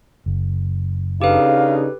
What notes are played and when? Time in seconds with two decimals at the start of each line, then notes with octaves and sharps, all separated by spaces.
0.26 F#1
1.22 C#3 D4 D#4 G4 A4 B4 F5